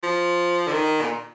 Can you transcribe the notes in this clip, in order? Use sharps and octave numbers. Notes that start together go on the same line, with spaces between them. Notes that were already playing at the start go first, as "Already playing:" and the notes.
F3
D3
D#3
A#2